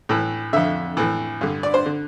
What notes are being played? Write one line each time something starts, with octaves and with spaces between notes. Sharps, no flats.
A2 E3
F2 D3 E5
A2 E3
G2 D3
D5
C5
D3